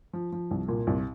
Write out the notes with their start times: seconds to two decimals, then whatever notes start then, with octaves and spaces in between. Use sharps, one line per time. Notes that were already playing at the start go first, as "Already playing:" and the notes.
0.13 F3
0.32 F3
0.51 C2
0.68 A#2
0.87 C2